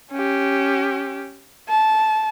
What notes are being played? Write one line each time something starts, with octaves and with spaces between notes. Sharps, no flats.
C#4 G4
A5